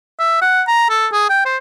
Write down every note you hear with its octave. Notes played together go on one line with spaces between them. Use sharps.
E5
F#5
A#5
A4
G#4
G5
C5